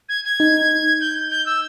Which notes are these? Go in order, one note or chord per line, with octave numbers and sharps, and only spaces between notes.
G#6
G#6
D#4
G6
G6
E6